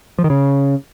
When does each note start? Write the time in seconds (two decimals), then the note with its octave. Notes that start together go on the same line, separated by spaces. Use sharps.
0.19 F3
0.24 D#3
0.30 C#3